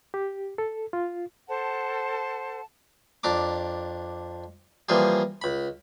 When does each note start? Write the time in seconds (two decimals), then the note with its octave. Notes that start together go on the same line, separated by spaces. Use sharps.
0.14 G4
0.58 A4
0.93 F4
1.48 A4 C5 F#5 A5
3.24 F2 D4 A#5 D6
4.89 E3 F3 G3 A#3 G#4
5.42 C#2 B5